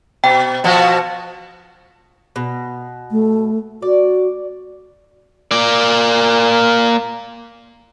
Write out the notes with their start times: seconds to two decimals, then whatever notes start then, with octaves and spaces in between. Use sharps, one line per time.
0.24 B2 G5
0.64 B2 F3 F#4
2.36 B2
3.11 A3
3.82 F#4 D5
5.51 A#3 D5